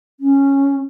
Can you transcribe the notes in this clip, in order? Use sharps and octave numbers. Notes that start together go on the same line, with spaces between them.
C#4